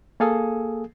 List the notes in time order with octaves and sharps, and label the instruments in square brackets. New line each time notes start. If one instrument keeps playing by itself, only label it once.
[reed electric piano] A#3 G#4 A4 F5 G#5 D#6